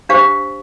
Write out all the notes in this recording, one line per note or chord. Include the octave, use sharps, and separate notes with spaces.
D4 G4 C5 F5